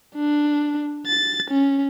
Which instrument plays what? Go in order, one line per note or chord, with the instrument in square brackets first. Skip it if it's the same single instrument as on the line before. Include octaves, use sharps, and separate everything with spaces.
[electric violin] D4
A6
C#4